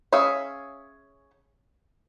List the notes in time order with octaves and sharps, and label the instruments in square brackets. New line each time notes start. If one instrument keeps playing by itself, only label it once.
[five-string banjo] C#4 G#4 E5 F5